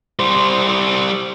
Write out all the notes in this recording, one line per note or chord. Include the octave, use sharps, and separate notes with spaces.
G3 C5